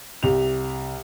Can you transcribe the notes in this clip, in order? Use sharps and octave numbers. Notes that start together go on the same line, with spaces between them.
C2 G4 F7